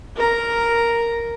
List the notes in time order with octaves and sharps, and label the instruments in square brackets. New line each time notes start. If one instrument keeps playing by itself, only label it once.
[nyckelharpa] A#4 A#5